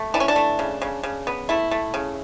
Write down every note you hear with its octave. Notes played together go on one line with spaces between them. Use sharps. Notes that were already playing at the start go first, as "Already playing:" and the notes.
Already playing: A3
E3 D4
C#4
D4
A3
C#3
C#3
C#3
B3
A3 E4
A3
C#3